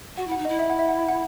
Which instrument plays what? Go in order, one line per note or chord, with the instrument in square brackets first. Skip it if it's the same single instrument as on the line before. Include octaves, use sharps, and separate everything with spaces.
[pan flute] F#4 [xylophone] F#5
[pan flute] E4 [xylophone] F#5
[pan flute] D#4
[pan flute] E4 [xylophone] D#5
[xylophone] E5
F#5
E5
F#5
E5
F#5